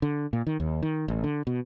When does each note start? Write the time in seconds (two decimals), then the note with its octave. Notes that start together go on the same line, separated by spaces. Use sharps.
0.02 D3
0.33 A#2
0.47 D#3
0.60 D#2
0.82 D#3
1.08 A1
1.24 D3
1.47 B2